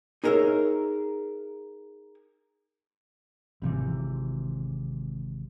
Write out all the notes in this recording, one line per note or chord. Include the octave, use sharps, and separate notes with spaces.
D#4 G#4 A#4 C#5 E5
G#1 C3 E3